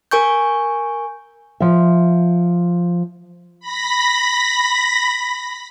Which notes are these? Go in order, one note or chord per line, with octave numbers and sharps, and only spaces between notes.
A#4 G#5 C#6 G6
F3 E5
B5 A#6 B6